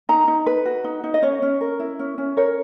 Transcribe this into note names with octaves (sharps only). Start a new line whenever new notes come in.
D#4 A#5
D#4
B4
F#4
D#4
D#4
D#5
C#4 C#5
C#4
A#4
E4
C#4
C#4
A#4 C#5